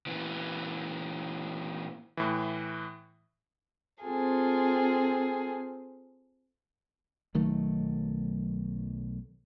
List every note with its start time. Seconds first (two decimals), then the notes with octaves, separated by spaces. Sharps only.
0.07 A#2 E3
2.17 A2 E3
4.02 C4 F4 G#4 A4
7.35 B1 D#3 F#3 A3